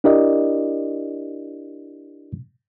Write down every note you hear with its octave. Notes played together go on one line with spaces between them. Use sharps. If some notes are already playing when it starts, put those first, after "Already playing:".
D4 E4 G4 A#4 D5 D#5